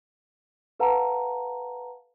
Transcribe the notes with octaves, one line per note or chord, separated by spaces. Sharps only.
A4 B4 F5 F#5 A5 A#5